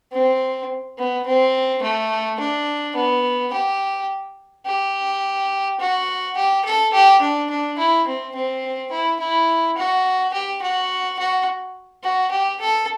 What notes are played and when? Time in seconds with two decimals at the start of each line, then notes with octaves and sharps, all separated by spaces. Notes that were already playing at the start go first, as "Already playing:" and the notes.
0.12 C4
0.98 B3
1.26 C4
1.82 A3
2.40 D4
2.96 B3
3.53 G4
4.66 G4
5.80 F#4
6.37 G4
6.64 A4
6.93 G4
7.21 D4
7.50 D4
7.78 E4
8.07 C4
8.35 C4
8.91 E4
9.19 E4
9.77 F#4
10.33 G4
10.62 F#4
11.19 F#4
12.03 F#4
12.31 G4
12.61 A4